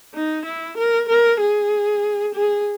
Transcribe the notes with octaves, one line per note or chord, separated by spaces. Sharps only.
D#4
E4
A#4
A#4
G#4
G#4